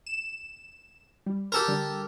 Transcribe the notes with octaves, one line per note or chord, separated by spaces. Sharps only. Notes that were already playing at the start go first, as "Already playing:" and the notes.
E7
G3
G4 A4 A#4
D3 G3